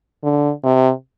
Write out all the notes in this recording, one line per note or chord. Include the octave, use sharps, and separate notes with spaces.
D3
C3